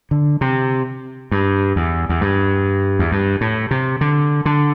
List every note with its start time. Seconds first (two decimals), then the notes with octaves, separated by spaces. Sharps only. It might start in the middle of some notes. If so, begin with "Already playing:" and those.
0.11 D3
0.41 C3
1.31 G2
1.76 E2
2.09 E2
2.21 G2
2.99 E2
3.12 G2
3.41 A2
3.71 C3
4.01 D3
4.46 D3